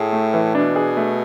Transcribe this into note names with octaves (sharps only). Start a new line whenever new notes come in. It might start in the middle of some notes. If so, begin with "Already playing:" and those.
Already playing: A2 G#4
A3
E3
B2 D4
G#4
A3